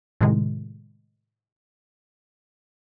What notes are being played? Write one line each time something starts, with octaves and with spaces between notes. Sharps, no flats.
A2 C3 D#3 G#3